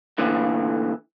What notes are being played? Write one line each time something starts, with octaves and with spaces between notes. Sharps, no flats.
A#2 D3 E3 A3